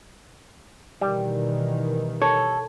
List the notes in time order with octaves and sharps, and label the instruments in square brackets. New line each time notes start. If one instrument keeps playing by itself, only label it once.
[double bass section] B2 D#3 E3 [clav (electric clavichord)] G3
[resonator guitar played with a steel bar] A4 [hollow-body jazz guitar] C#5